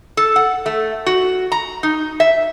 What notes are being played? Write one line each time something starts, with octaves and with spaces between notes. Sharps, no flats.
A4
F#5
A3
F#4
A#5
D#4
E5